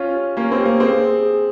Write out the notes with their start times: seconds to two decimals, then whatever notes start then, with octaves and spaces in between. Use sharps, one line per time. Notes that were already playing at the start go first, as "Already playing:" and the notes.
Already playing: C#4 F4 C#5
0.15 G4
0.36 A#3 C#4 G4
0.52 C4
0.59 G4
0.65 A#3
0.79 C4 G#4
1.02 G#4
1.23 G#4